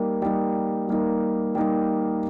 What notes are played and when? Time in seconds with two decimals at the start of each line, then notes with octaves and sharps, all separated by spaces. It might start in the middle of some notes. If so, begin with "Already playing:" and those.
Already playing: G3 A#3 D#4
0.22 G3 A#3 D#4
0.88 G3 A#3 D#4
1.55 G3 A#3 D#4